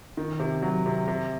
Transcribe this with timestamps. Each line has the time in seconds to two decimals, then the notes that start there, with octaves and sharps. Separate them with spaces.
0.17 D#3
0.40 C3
0.62 F#3
0.86 C3
1.08 C3